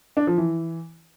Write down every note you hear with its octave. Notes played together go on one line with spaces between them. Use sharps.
D4
F3
E3